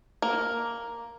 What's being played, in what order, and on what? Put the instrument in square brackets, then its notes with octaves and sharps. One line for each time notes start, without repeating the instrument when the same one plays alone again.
[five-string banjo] A#3